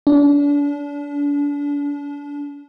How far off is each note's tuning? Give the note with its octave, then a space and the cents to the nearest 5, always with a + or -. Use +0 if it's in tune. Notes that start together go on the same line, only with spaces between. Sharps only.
D4 -35